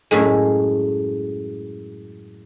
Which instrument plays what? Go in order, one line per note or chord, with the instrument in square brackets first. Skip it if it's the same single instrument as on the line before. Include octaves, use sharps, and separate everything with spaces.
[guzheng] F#2 A2 G#3